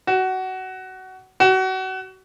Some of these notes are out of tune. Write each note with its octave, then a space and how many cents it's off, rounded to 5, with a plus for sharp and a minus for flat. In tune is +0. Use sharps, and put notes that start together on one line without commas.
F#4 +20
F#4 +30